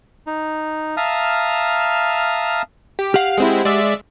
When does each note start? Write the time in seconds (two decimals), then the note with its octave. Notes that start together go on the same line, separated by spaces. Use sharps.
0.27 D#4
0.97 E5 F5 A5 A#5 D#6 F6
2.99 G4
3.14 G4 F5 F#5 F6
3.38 G#3 C4 E4
3.64 G#3 D5 E5